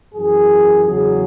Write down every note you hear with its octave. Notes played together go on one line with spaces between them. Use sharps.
F#2 E3 G#4
E2 C#3 F#3 G#4